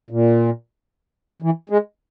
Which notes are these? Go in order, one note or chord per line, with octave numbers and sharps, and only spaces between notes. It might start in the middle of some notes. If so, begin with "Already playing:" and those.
A#2
E3
G#3